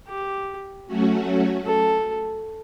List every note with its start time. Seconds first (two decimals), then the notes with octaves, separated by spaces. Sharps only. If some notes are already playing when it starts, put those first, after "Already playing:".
0.09 G4
0.87 F#3 A3 C#4 F#4
1.66 A4